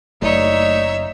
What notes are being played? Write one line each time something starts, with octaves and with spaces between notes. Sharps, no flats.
F#1 A3 D#4 C#5 D5 E5